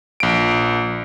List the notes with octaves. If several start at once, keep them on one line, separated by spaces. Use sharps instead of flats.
A#1 D7